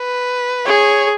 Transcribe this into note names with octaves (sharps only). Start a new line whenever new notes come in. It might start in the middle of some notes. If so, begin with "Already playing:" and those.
Already playing: B4
G#4 C#5